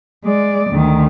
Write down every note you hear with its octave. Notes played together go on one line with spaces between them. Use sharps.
G#3 D5
D2 D#3